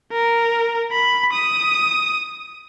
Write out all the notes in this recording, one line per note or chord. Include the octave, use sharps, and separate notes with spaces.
A#4
B5
D#6